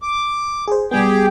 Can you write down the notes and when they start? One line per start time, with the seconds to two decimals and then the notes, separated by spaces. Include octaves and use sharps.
0.02 D6
0.67 G#4 C5
0.91 B1 G3 B3 G4 G#4 G5